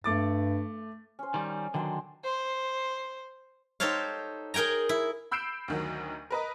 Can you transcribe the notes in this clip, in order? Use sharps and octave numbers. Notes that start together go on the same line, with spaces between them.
G2 A3 D6 A6
C#4 C5
D#3 G3
D3 D#3 F#3 G5 G#5 C6
C5
D#4 G4 A4 C5 C#5 F5
G#4 A#4 G5 G#5 A#5
E4
B5 E6 G6 C7 D7 E7
D2 D#3 F#3
A#4 B4 D#5